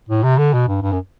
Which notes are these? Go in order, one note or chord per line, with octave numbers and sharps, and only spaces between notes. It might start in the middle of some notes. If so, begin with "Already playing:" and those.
A2
C3
D3
B2
G2
G2
F#2